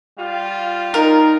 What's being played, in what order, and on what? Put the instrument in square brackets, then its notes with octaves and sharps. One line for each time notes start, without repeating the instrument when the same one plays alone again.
[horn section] G3 F4
[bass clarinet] D#4 [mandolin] A#4